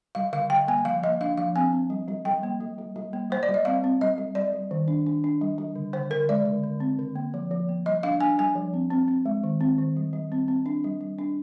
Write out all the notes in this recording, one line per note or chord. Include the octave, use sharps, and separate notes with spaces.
G3 F5
D3 F5
G3 G5
A#3 G#5
F3 F5
A#3 D#5
D4 F5
F3 F5
C4 G#5
C4
G3
G3
G3 G5
A#3
G3
G3
G3
A#3
G3 C5
D5
G3
D#5
C4 F5
C4
G3 D#5
G3
G3 D5
G3
D#3
D4
D4
D4
G3
G3
D3
D3 C5
D3 A#4
G#3 D5
D3
D3
C4
D3
A#3
F3
F3
A#3
G3 D#5
D4 F5
D4 G#5
G3 G#5
F3
C4
C4
C4
G#3
D#3
C4
D#3
G3
G3
C4
C4
D4
G3
G3
D4